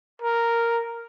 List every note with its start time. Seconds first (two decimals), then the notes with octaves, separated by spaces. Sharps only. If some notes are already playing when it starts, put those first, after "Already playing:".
0.22 A#4